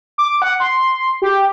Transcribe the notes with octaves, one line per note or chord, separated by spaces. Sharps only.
D6
F#5
C6
G4